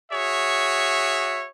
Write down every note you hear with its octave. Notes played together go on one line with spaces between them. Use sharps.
F#4 G#4 C#5 E5